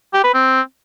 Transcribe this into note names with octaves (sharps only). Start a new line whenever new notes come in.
G4
B4
C4